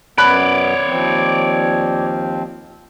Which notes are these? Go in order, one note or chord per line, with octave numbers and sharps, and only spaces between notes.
F#2 B3 C#5 D5 B5 F#6
D#2 F3 C4